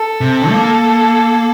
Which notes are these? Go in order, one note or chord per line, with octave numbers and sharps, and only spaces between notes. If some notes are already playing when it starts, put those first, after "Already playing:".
Already playing: A4
C3
A#3